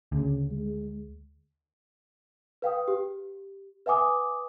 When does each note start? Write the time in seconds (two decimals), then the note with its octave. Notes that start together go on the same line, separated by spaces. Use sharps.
0.12 D2 C#3
0.51 G#3
2.62 B4 F5 G5 D#6
2.88 G4
3.86 B4 E5 F#5 G#5 D6 D#6